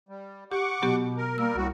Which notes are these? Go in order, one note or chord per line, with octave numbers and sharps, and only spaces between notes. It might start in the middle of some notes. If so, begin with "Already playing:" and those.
G3
G4 F#5 C#6 D6
B2 F#3 B3 G4
A#4
G3 A#3 A#4 E6
C2 A2 F#4